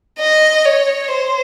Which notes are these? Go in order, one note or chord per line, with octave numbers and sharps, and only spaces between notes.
D#5
C#5
C5